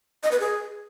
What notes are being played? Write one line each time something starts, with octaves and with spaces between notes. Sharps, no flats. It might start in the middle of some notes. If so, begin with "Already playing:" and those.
D#5
B4
G#4